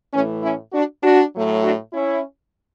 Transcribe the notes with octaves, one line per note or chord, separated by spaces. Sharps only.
A2 E3 A3 C#4
C#4 E4
D4 F#4
D4 F#4
A2 F#3 A3
D4 F#4
C#4 E4